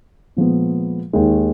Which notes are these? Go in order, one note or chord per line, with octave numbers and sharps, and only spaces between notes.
A#2 F3 G#3 B3
D#2 D#3 G#3